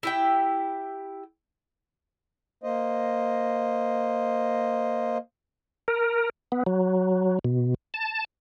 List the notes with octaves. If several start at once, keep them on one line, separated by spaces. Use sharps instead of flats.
E4 G4 G5
A#3 C5 D#5
A#4
B3
F#3
B2
A5